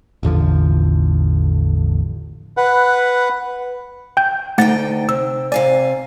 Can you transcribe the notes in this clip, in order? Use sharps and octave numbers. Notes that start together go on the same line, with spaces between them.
A1 E2 D3 F3
B4 F#5
G5 G6
D2 A3 D#4 F#5 G5 A6
C3 E6
C3 D5 F5 G#5